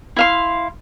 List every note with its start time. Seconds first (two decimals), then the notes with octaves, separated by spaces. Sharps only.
0.16 E4 F5 C6